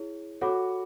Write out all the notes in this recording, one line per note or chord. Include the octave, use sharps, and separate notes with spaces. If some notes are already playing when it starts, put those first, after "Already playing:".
Already playing: E4 G#4 C#5
F#4 A4 C#5 F#5 B5 D6